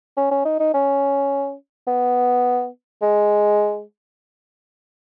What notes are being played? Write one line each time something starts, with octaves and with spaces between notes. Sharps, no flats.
C#4
C#4
D#4
D#4
C#4
B3
G#3